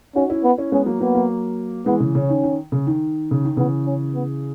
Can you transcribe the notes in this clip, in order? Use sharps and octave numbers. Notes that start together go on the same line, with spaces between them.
C#4 D#4 F#4
C#4 E4
B3
C#4 E4
G#3 B3 C#4
F#3 A#3
F#3 A#3 B3
F#3 A#3
E3 G#3 B3
C#3 E3
C#3 C#4
D#3
D#3
C#3
D#3
C#3
D#3
C#3 E3 B3
C#4
B3